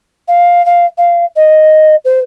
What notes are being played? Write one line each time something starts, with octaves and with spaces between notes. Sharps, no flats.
F5
F5
F5
D#5
C5